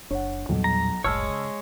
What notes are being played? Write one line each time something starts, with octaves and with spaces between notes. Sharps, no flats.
F#1 D4 C#5 F#5
B1 E2 A#2 G3
A#5
F#1 C#2 A2 G#3 C#5 A5 E6 F6
C#3